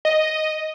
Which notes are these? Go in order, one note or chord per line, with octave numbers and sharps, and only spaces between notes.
D#5